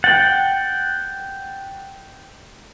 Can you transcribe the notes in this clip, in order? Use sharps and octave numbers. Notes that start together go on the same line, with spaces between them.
F#5 G5 A6